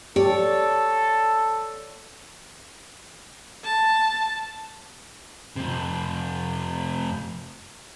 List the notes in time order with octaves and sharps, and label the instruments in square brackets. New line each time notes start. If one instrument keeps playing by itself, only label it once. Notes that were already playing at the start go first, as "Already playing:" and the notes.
[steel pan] G4 [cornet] A4 [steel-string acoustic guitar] C#5 D5
[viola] A5
[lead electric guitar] F2 C3